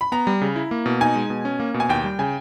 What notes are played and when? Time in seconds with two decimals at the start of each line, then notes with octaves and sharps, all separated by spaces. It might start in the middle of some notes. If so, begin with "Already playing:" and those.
0.01 B5
0.12 B3 A#5
0.27 G3
0.41 C#3
0.56 E4
0.71 A#3
0.86 B2
1.01 D#4 G#5
1.15 G#3
1.30 B2
1.45 C#4
1.60 A#3
1.74 B2
1.80 G#5
1.89 D#2 G5
2.04 G3
2.19 C#3 G#5